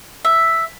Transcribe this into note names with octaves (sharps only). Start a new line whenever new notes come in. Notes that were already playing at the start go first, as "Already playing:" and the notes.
E5